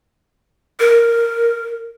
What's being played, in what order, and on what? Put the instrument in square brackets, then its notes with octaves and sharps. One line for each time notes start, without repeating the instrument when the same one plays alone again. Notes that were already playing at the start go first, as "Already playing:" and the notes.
[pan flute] A#4